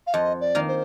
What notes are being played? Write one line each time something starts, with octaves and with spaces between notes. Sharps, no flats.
F5
F2 D#5
D5
D#3 A#3
C5